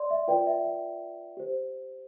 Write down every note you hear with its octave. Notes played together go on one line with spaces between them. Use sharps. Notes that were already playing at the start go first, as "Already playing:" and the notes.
Already playing: D5 C6
E5
F4 B4 D5 G5
E5
E5
G4 C5